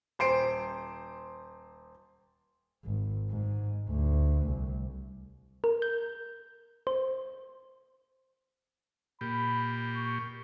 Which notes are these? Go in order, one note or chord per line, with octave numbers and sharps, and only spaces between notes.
D#1 C5 C7 D7
G#1
G#2
D2
C2
A#4
G6
C5
A#2 G4 B5
C#6